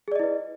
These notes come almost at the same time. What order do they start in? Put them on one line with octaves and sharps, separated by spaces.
G#4 D5 D#5 E4 B4